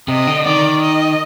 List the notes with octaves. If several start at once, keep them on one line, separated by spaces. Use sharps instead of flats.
C3 D#5
D3
D#3 D5
D#5